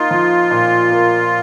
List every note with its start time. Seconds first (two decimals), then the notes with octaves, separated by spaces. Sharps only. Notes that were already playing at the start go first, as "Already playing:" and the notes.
Already playing: A#3 D#4 F4
0.11 F3
0.51 A#2
0.91 A#3